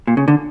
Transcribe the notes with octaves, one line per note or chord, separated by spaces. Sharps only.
A#2
C#3
D3